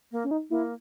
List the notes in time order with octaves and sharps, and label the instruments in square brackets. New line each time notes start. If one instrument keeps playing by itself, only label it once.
[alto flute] A#3
[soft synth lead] C#4
D#4
[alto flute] A#3 [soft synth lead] E4